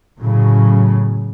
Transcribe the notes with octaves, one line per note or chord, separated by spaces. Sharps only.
A2 C#3 F#3